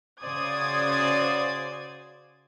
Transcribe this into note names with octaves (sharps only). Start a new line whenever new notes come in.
C#3 F#4 C5 D5 D#6 G#6